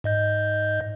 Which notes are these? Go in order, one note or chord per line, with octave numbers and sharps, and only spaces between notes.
G#2 D#5 G6